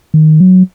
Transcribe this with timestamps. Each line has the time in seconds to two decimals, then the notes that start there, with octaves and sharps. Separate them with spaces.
0.14 D#3
0.40 F#3